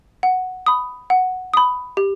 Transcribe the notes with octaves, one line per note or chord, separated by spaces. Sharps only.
F#5
B5 D#6
F#5
B5 D#6
G4